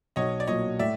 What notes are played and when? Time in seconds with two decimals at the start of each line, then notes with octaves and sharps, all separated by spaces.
0.16 B1 C#5 D#5
0.40 D5
0.47 A#2 F#3 A#3 C#5 D#5
0.79 A2 D5 E5